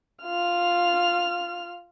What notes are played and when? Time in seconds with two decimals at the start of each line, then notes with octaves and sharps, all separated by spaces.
0.23 F4 F6